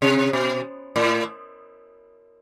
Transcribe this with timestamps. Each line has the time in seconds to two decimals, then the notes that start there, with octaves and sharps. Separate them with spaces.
0.02 C3
0.33 B2
0.96 A2